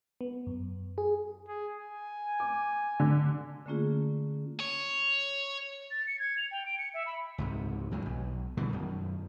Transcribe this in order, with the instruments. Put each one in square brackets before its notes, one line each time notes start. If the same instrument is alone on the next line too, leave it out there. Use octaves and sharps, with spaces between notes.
[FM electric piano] B3
F#2
G#4
[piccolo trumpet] G#4
G#5
[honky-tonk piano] D6
D3
[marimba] D3 A3 A#3 C#4 F4 G#4
[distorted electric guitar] C#5
[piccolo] A6
C#7
G#6
F7
G5
D7
C#7
E5
B5
[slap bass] C#2 G#2 C3
D#2 A2 F#3
B1
B2 D3 E3 G3
F#2 D#3